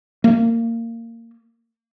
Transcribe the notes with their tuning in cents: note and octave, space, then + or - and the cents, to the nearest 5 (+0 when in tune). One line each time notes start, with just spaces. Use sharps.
A#3 -20